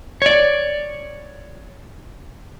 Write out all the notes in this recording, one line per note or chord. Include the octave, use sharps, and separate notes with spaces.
C#5 D5